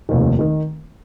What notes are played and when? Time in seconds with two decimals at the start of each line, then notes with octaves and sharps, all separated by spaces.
0.09 F1 D#2 D#3
0.39 D#3